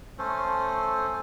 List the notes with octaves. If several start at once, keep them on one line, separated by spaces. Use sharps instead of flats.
A3 C#4 A4 C5